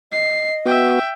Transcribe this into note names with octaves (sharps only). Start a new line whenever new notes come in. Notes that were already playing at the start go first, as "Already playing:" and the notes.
D#5 C7
B3 F#4 E5 G5